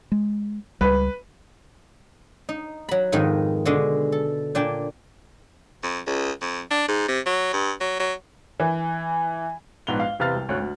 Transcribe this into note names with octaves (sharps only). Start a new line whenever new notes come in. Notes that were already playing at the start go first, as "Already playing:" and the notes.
G#3
C#2 G3 B4
D#4
F#3 B5
F2 G#2 D#3 B4 D#5
B2 D3 G#3
A4
A#2 D4 G5 G#5
F2
C#2
F2
D4
G#2
C3
F#3
G2
F#3
F#3
E3
A#1 G#2 B3 F7 G7
F5
E2 C3 B4 F5 F6 A6
C2
G#1 D2 C#5 F#6
D2